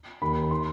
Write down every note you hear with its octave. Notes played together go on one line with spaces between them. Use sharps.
D#2 D#3 B5
B5
D#3 C6